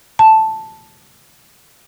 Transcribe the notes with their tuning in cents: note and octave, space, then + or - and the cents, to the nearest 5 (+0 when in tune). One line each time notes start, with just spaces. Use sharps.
A5 +0